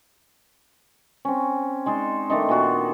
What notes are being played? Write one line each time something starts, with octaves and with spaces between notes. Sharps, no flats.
C4 C#4
G#3 D#4 C5 D5
D#3 A3 D4 D#4
A#2 B3 F#4 C6